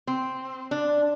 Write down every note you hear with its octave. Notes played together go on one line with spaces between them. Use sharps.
C4
D4